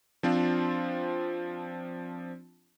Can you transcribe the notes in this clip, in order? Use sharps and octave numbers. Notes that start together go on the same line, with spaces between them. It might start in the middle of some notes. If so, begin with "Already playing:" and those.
F3 C4 D4 F4